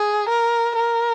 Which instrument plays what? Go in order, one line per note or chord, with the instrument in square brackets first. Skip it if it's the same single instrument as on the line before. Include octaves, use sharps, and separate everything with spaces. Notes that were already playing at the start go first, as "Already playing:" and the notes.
Already playing: [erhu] G#4
A#4
A#4